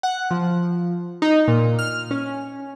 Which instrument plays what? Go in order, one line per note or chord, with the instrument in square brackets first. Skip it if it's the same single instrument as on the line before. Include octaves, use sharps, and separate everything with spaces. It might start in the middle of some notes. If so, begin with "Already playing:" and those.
[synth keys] F#5
F3
D#4
A#2
F6
C#4